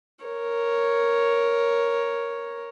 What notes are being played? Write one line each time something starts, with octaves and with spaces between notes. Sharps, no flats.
A#4 C#5